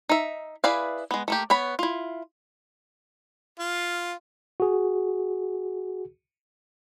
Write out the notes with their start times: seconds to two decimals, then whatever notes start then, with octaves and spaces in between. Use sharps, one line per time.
0.09 D#4 E5
0.64 E4 G#4 B4 D5 F5
1.11 G#3 B3
1.28 A3 A#3 G4
1.50 B3 C#5 B5
1.79 E4 F4
3.59 F4
4.60 F#4 G#4